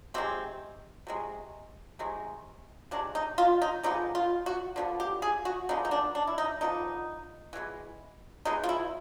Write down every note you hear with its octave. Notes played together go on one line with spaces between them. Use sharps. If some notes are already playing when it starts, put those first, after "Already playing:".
C3 D#3 G#3 C4
C3 D#3 G#3
C3 D#3 G#3
C3 D#3 G#3 D4
D#4
F4
D#4
D3 F3 G#3 B3 D#4
F4
F#4
D3 F3 G#3 B3
G4
G#4
F#4
D3 F3 G#3 B3 D#4
D#4
D4
D4
E4
D#4
D3 F3 G#3 B3 D#4
E3 G#3 B3
E3 G#3 B3 D#4
F4
E4